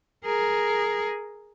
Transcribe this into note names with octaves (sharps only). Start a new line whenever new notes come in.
G#4 A#4